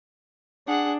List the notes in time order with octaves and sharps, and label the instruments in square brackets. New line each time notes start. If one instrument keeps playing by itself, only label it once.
[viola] D4 [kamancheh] G#4 F#5